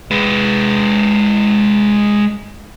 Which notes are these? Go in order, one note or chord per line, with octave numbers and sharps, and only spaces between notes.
G#3 B4